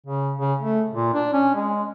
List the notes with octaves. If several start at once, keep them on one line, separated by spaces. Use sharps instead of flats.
C#3
C#3
A3
A#2
D4
C#4
G#3